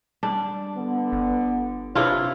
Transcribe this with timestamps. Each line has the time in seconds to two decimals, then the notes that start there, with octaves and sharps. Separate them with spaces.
0.23 G3 D4
0.76 D3 B3
1.12 G1
1.95 C3 D4 E4 F4 B4 C#5